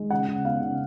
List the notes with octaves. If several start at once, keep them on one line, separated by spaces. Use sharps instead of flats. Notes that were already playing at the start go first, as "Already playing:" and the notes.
Already playing: G#3
C#3 F#5
C#3
B3 F5
C#3